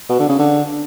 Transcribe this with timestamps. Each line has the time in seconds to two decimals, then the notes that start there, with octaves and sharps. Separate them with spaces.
0.09 B2
0.19 D3
0.29 C#3
0.39 D3